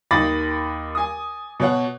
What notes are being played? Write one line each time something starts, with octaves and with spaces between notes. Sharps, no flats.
D#2 D#4 B5 D6 A6 A#6
G#5 D#6
B2 C#5 F#5